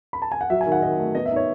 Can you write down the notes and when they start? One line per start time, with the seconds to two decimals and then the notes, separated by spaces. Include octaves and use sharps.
0.13 B5
0.22 A5
0.32 G#5
0.41 F#5
0.50 F#3 E5
0.61 G#5
0.66 D#3
0.72 F#5
0.82 D#3 D#5
0.98 A3
1.15 B3 D#5
1.26 E5
1.31 D#4
1.36 C#5